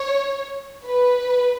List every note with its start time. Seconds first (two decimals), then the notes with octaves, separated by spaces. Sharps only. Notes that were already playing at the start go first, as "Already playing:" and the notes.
Already playing: C#5
0.84 B4